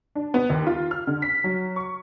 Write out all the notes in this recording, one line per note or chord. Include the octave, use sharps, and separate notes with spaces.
D4
B3
D#2
F4
F6
D3
B6
F#3
C#6